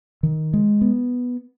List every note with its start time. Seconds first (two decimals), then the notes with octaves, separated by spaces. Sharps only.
0.23 D#3
0.53 G#3
0.81 B3